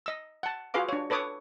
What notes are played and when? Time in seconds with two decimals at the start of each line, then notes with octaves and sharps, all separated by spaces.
0.06 D#5 E6
0.43 F#5 A5
0.74 F4 F#4 G#4 B4 F5 D6
0.89 D4 C#5
1.10 A4 B4 C#5 D6 D#6